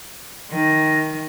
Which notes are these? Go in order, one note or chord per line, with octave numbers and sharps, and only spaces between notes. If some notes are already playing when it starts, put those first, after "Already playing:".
D#3